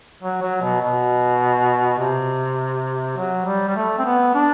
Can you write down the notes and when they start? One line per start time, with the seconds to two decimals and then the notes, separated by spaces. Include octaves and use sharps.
0.23 F#3
0.42 F#3
0.62 B2
0.81 B2
1.99 C3
3.17 F#3
3.46 G3
3.68 G3
3.76 A3
3.98 C4
4.05 B3
4.34 D4